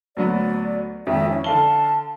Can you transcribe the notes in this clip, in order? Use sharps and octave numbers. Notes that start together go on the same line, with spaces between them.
D2 F#3 B3 D5
G#1 F2 E5
E3 C#4
D3 F5 A5 G7